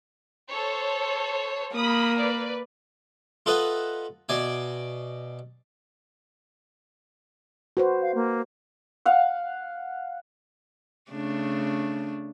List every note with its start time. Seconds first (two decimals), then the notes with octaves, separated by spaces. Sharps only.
0.49 A4 C5 C#5
1.74 A#3 B5 D#6
2.19 B4 D5
3.46 F4 A4 B4 D#5 E5 F#5
4.29 B2 D5 E5 G#5
7.77 F#4 B4 C5
8.02 F5
8.15 A#3
9.05 F5 F#5
11.11 C#3 A3 D4